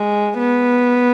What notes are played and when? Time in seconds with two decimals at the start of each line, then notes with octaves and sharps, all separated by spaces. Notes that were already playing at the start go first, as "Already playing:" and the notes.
Already playing: G#3
0.39 B3